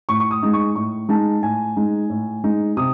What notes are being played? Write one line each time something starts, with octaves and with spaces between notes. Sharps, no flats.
A2 C#6
C#6
D#6
G#3 D#4
C#6
A2 C#6
G#3 D#4 A5
A2 G#5
G#3 D#4
A2
G#3 D#4
C3 D#6